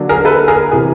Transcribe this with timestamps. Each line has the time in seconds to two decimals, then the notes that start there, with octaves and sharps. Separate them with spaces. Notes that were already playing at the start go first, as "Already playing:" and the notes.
Already playing: D3 F#3 A#3 D4
0.09 G#4 A#4
0.25 A4 B4
0.48 G#4 A#4
0.71 C3 E3 G#4